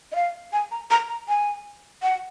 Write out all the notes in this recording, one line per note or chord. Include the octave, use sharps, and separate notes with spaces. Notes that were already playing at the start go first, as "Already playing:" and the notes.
D#5
F5
G#5
A#5
A#5
A#5
G#5
F#5